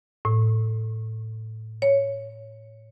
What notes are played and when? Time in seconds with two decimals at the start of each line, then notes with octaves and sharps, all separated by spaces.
0.25 A2
1.82 C#5